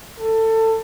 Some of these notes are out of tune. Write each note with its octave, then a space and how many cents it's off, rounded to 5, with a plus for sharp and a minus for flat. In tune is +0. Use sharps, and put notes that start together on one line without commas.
A4 +20